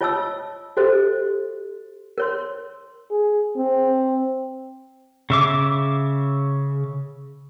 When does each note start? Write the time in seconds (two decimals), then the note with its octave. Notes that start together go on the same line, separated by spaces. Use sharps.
0.01 F4 C#5 D#5 A5 D#6 E6
0.77 F#4 G4 A4 C5 D#5
2.18 A#4 C#5 C6
3.11 G#4
3.57 C4
5.30 C#3 E5 D6